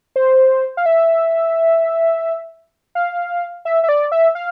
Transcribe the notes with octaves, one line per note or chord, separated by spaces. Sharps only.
C5
F5
E5
F5
E5
E5
D5
E5
F5